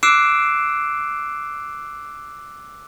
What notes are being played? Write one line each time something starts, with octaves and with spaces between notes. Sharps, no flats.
D6 E6 F#6 C7 D7 E7